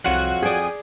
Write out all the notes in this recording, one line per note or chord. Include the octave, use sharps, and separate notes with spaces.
C2 F2 F#3 F4 F#4 F#5 F#6
G#4 D5 G5 G#5 D#6